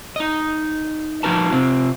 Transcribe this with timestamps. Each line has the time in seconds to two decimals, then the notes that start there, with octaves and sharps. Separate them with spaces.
0.16 D#4 D#5
1.23 F3 D#4 F#4 A#4 B4 A5
1.52 C3 C4 F4